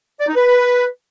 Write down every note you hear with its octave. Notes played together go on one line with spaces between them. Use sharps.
D5
D#4
B4